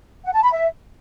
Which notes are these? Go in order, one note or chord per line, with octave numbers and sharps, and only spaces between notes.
F#5
A5
B5
E5